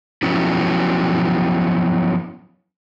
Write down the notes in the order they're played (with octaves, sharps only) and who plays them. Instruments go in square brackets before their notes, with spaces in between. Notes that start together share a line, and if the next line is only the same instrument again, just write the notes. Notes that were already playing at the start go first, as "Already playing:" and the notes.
[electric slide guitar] F3 F#3 B3 C#4 E4